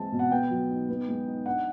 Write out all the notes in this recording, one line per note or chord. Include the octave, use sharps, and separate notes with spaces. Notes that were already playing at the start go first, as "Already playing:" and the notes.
Already playing: E3 G#3 C4 A5
B2
F#5
B3 G5
F#3
D#4
B3
G#3
D#4
D4 F#5